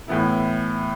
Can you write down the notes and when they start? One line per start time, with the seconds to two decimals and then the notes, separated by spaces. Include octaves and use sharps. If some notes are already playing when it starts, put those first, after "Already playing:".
0.08 A2 E3 B3 E4